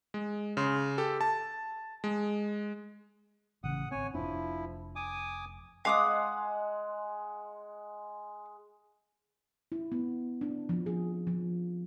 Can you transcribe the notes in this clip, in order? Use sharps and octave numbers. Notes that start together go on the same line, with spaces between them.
G#3
C#3 C6
G4 A4
A5
G#3
A1 C#3 F#5 D#6
G#1 C4 C#5 G#5
F1 F3 D4 E4
G#5 D6 D#6
G#3 F5 F#5 D6 D#6
E4
B3
D4
F3
G#4
F3